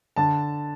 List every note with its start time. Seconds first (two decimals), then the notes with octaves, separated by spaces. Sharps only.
0.16 D3 A5